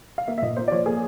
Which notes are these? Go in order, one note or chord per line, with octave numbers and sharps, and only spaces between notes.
F5
A#3 E5
E5
A#2 D#5
A#3 C5
D5
F3 C#5
A#3 G#4